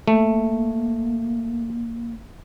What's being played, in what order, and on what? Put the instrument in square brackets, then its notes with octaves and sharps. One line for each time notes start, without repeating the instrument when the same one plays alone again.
[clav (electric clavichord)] A3 [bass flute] A#3